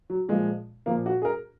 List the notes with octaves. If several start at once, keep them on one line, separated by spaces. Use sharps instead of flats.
F#3
A#2 F3 G#3
A#2 F3 A#3
F#4
G#4
A#4